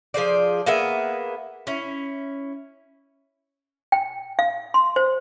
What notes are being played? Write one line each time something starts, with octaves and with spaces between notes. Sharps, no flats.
F3 G#4 C5 D5
A#3 B3 G#4 E5
C#4 E4
G5
F5
C6
C5